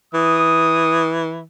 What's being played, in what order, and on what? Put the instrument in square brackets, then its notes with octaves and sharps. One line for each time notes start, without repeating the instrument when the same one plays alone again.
[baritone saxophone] E3 [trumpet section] D#6